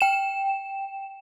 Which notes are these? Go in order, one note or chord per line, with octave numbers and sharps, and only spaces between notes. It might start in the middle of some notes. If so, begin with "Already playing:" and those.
G5 E7